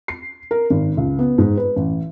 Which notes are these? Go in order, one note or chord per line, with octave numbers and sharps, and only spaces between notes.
C7
A#4
G#1
C#2
B3
G#2
B4
A1